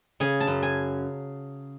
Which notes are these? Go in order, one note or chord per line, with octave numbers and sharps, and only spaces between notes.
C#3 G#5
A5
F#2
G#5